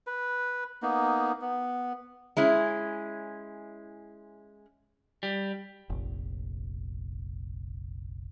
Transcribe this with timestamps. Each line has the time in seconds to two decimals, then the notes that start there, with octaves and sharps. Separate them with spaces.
0.07 B4
0.82 A#3 B3 D#4
1.41 B3
2.37 G#3 C#4 E4
5.23 G3
5.90 F1 A#1